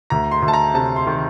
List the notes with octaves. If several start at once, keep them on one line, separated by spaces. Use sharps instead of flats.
D2 A#5
C6
D2
A5
A#5
C3 A5
C6
D#3